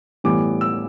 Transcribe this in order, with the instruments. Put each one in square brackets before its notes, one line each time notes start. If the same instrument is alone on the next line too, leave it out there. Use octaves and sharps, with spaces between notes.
[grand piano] A2 E3 G3 B3 D6
E6